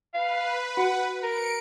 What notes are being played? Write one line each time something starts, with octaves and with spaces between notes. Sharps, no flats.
B4 F5
F#4 F#5
A#4 C#7 D7